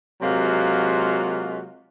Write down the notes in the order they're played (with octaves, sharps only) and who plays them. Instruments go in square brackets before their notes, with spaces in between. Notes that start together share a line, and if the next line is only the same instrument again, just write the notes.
[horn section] C3 F#3 G#3 A#3 F4 F#4